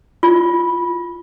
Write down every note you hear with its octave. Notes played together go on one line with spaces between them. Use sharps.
F4